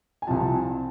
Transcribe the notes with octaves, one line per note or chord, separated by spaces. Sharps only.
G#5
C2 C3 F3 A5